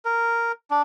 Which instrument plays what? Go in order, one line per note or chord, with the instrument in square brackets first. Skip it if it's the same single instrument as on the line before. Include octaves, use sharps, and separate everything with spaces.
[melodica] A#4
D4